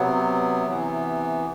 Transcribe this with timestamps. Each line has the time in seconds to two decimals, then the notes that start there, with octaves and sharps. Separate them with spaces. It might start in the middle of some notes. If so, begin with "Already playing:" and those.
Already playing: C3 F#3 B3
0.66 C3 E3 B3